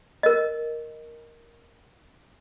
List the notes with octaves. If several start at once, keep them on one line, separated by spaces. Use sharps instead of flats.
A#4 D#5